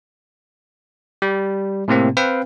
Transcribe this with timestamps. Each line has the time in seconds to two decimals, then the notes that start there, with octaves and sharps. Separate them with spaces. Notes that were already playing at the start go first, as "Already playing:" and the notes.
1.22 G3
1.88 A2 C3 A#3 C4
2.17 C4 B4 F5 G5